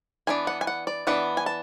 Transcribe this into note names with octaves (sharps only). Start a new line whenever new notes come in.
E3 B3 D4 G#5
F#5
G#5
F#5
D5
E3 B3 D4 F#5
G#5
A5